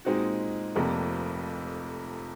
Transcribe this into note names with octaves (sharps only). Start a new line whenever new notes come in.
A#2 G#3 C4 D#4 F#4
F1 F2 C3 F3 A#3